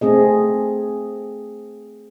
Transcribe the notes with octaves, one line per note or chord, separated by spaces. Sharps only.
A3 C4 G#4 D#5